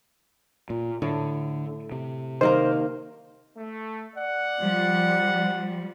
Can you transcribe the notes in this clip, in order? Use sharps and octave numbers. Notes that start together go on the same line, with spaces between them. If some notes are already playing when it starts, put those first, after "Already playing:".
A#2
A2 D3
C3
D#3 A#3 A#4 C5
A3
D5 F#5
F3 G3